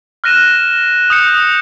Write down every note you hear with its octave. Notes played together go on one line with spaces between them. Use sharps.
F6 F#6 A#6 D#7 E7
D#6 G6 C#7